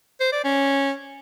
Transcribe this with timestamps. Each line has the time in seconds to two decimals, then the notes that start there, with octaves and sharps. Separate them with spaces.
0.20 C5
0.32 D5
0.44 C#4